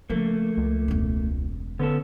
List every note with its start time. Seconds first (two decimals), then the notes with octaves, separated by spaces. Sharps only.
0.10 C#3 F3 A3 A#3
0.57 C#2
0.88 E1 C#3
1.79 D3 B3 C#4 A4